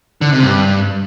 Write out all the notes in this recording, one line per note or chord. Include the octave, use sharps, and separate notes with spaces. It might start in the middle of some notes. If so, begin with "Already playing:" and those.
D3
C3
G2